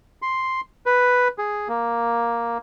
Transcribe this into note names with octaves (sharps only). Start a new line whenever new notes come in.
C6
B4
G#4
A#3